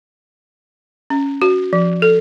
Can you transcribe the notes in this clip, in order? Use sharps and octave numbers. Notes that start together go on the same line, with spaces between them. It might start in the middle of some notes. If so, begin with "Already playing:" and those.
C#4
F#4
F3
A4